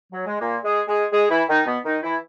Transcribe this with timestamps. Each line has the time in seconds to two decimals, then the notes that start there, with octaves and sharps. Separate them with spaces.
0.12 F#3
0.26 G#3
0.39 A#2 A#3
0.64 G#3 G#4
0.88 G#3 G#4
1.12 G#3 G#4
1.30 E3 E4
1.48 D#3 D#4
1.66 B2 B3
1.84 D#3 D#4
2.03 E3 E4